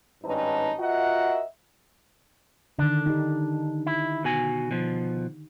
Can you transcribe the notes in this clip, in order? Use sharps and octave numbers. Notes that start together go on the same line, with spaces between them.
G#1 G2 C#4 D#4 B4 A5
F4 F#4 A#4 D#5 E5 F#5
D3 D#3 D4
D#4 G4
E4
B2 F#4 G#5
B2 F3